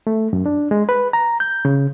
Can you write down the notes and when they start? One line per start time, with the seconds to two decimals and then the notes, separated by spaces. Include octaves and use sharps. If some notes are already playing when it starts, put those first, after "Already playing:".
0.07 A3
0.33 F#2
0.46 D4
0.71 G#3
0.89 B4
1.13 A#5
1.40 G6
1.65 C#3